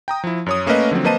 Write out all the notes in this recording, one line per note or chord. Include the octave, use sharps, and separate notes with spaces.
G5 A#5 D#6
F3 E4
F#2 C#5 D#6
A3 A#3 C#4 A#4 B4 D#5
D3 F3 F#3 C4
A#3 B4 C5 D#5 A5 D#7